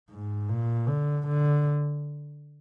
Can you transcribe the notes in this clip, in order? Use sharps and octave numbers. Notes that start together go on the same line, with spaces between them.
G#2
A#2
D3
D3